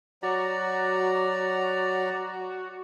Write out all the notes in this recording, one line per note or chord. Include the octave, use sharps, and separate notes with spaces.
F#3 F#4 D5 A#5